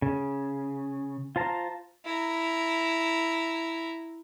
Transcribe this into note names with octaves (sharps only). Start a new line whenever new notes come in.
C#3
F4 C5 A5 A#5
E4 A#5